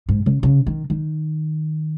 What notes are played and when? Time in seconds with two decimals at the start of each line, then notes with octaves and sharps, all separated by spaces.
0.09 G#2
0.26 C#3
0.43 C#3
0.66 D#3
0.90 D#3